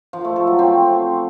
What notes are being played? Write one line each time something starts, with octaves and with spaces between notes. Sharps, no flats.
F3
A3
A4
F#3
C4